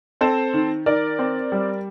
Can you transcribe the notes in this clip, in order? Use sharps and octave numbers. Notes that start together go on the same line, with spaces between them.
C4 A4 C5
D#3
D#3 A#4 D5
C4
G3